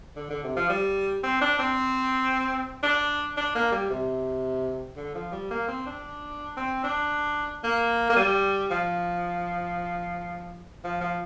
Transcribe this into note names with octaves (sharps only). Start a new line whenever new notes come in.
D3
D3
C3
F3
G3
C4
D4
C4
D4
D4
A#3
G3
C3
D3
F3
G3
A#3
C4
D4
C4
D4
A#3
A#3
G3
F3
F3
F3